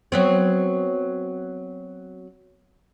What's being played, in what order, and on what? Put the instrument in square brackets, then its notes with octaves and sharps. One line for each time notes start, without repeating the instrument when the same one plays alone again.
[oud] F#3 B3 C4